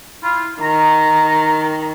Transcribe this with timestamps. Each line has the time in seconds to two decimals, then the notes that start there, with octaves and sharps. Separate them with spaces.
0.22 E4 F4
0.61 D#3 A#5